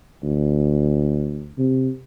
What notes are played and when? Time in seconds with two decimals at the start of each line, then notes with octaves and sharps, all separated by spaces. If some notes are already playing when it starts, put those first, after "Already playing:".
0.23 D2
1.58 C3